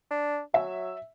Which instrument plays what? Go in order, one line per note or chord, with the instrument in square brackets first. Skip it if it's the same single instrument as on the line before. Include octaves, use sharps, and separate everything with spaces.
[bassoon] D4
[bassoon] F#3 [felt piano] E5